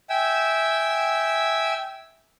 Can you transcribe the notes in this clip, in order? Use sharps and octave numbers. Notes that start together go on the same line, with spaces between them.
E5 G5 G#5 E6